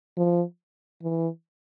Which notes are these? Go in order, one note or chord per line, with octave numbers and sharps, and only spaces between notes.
F3
E3